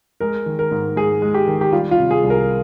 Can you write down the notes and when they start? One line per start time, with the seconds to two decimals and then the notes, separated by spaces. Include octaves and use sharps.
0.20 G#3 A#4
0.46 D#3
0.59 A#4
0.71 G#2
0.96 G#2 G#4
1.22 G#3
1.34 G4
1.47 D#3
1.61 G4
1.73 G3 F4
1.91 F4
1.98 C3
2.11 G#4
2.23 C2
2.30 A#4